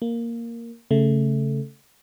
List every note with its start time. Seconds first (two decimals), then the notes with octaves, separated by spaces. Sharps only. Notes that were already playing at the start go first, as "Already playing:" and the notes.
0.02 A#3
0.91 C#3 A3